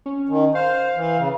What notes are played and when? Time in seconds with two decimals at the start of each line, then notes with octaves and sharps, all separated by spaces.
0.06 C#4
0.29 D#3
0.55 C5 F5
0.95 E3
1.17 C#3